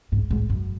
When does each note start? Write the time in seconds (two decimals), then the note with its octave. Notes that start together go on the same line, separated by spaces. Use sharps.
0.12 G#2
0.30 G#2
0.50 F#2